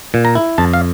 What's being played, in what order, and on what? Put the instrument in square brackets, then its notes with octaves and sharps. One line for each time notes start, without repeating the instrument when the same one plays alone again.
[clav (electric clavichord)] A#2
A#5
E4
F2 A5
F5